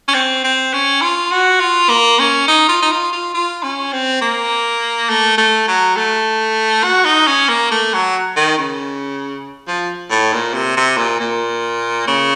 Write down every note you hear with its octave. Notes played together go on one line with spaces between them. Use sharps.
C#4
C4
C4
C#4
F4
F#4
F4
A#3
C#4
D#4
F4
D#4
F4
F4
F4
C#4
C4
A#3
A3
A3
F#3
A3
F#4
D#4
C#4
A#3
A3
F#3
D#3
C#3
F3
A2
A#2
C3
C3
A#2
A#2
C#3